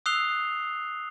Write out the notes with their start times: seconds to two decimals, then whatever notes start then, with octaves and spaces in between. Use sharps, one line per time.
0.06 D#6 E6 F#6 C7 F7 G7